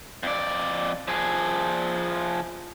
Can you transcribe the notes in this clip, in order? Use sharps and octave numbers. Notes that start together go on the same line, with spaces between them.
F2 D5
F3 G#4